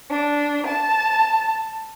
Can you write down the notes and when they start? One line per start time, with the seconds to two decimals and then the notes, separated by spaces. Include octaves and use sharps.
0.11 D4
0.67 A5